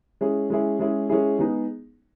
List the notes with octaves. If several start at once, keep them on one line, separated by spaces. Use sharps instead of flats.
G#3 C#4 E4 G#4
G#3 C#4 E4 G#4
G#3 C#4 E4 G#4
G#3 C#4 E4 G#4
G#3 B3 D#4 G#4